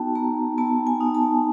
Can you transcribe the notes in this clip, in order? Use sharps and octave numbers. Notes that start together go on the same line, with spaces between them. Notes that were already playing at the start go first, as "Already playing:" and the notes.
Already playing: B3 D#4 F#4 G5 A5
B3 A#5
B3 A5
G#5
D#4
A5